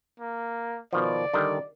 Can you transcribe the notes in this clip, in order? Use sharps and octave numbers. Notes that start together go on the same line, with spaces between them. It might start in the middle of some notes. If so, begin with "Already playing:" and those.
A#3
B2 D#3 F3 D5
D3 D#3 G3